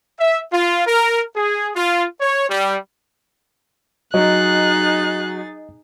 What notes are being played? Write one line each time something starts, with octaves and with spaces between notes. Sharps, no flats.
E5
F4
A#4
G#4
F4
C#5
G3
F#3 D#4 G#4 D#5 F#6 A6